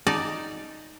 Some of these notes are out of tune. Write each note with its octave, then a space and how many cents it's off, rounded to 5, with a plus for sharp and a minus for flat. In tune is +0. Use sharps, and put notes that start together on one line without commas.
D#4 +0 D5 +0 A5 -20